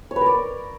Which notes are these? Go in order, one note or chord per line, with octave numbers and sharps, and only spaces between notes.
C#5
B4
A#4
D5